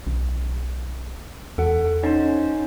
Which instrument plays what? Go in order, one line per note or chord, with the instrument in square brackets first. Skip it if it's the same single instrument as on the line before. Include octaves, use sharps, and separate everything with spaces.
[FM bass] B1
[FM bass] E2 [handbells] A4 F#5
[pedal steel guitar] C#4 C5 [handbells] D#4